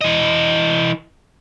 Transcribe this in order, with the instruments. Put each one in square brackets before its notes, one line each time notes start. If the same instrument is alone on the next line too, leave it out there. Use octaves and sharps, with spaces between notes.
[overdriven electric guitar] E3 D#5